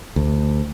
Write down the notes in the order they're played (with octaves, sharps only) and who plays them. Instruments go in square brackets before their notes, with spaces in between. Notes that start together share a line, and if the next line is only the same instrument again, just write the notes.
[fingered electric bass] D2